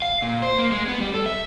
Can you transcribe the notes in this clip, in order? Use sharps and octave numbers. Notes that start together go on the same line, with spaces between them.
F5
A#2
C5
A#3
G#3
B3
G3
A4
E5